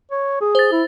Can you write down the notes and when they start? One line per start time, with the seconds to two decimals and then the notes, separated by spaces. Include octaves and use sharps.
0.11 C#5
0.41 G#4
0.55 C5 A6
0.72 E4